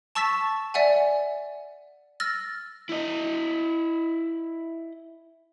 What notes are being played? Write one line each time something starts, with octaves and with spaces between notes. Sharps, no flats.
A5 C#6 E6 A6 B6 E7
D5 E5 F#5 G#5
E6 F6 A6 A#6
E4 D#5